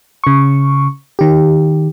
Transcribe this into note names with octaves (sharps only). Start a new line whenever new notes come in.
C#3 C#6
D#3 G4